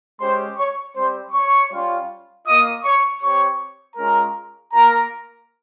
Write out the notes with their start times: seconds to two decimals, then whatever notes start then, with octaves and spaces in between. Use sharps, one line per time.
0.19 G#3 C#4 G4 C5 C6
0.57 C#5 C#6
0.95 G3 C4 G4 C5 C6
1.32 C#5 C#6
1.71 G3 C#4 F4
2.46 A#3 F4 D#5 D#6
2.84 C#5 C#6
3.21 C4 G4 C#5 C#6
3.96 G#3 C#4 F4 A#4 A#5
4.72 A#3 F4 A#4 A#5